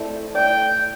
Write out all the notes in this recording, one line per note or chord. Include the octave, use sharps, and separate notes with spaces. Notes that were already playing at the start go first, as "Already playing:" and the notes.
Already playing: A3 C4 E4 A4 D5
A3 E4 A4 D5 G5